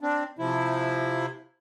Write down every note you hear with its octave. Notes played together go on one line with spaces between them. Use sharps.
C4 D4
C3 F3 E4